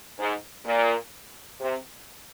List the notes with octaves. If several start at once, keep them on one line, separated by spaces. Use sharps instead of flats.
G#2
A#2
C3